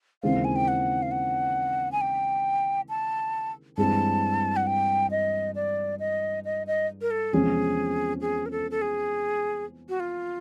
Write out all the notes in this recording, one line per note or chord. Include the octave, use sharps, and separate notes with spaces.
D#2 C#3 E3 G#3 C4 F5
G#5
G5
F#5
F5
F#5
G#5
G5
A5
G2 E3 G#3 C4 A5
F#5
G5
D#5
D5
D#5
D#5
D#5
A#4
A4
E2 C3 F3 G#3 C#4 G#4
G#4
A#4
A4
A4
G#4
F#4
F4